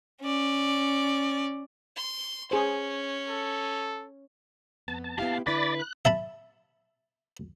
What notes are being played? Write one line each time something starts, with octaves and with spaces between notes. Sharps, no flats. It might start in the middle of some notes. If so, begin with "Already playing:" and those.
C#4 D5
C6
C#4 G#4 C5
A4
F2 B3 A5
A5
A#2 B3 E4 G4 F5
D3 E4 B4 D5 B5 A6
F#6
E5 A5 B5